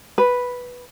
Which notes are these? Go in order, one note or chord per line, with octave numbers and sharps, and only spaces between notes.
B4